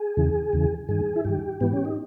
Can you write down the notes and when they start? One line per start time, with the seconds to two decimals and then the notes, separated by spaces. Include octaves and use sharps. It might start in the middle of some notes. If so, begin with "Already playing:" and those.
Already playing: G#4
0.17 E2 C#3 E3
0.53 E2 C#3 E3
0.89 G2 D#3 G#4
1.16 E4
1.25 G2 D#3 G4
1.61 G#2 E3 B3
1.73 C#4
1.85 D#4